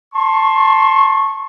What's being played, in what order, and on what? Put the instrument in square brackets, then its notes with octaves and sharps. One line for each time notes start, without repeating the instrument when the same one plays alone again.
[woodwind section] A5 C6 C#6